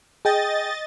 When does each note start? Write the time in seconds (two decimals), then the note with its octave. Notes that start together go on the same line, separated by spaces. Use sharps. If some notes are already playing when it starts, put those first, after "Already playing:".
0.25 G#4 D#5 G5 A6